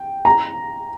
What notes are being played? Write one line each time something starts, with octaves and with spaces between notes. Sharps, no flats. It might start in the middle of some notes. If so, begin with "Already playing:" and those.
Already playing: G5
A#5